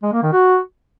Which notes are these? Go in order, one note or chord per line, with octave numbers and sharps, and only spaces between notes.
G#3
A#3
D#3
F#4